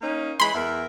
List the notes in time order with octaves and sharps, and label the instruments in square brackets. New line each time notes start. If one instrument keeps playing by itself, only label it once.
[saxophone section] A#3 C#4 D#4
[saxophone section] E3 G#3 [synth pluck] B5 C6
[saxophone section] E2 A#4 E5